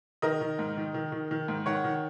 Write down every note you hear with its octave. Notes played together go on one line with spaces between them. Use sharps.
D#3 A#4 D#5
D#3
G#2
D#3
D#3
D#3
D#3
G#2
D#3 C#5 F#5
D#3